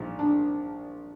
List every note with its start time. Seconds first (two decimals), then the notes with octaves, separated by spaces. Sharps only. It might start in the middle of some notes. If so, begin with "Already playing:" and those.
Already playing: A#1 A#2 F3 D#4
0.19 D4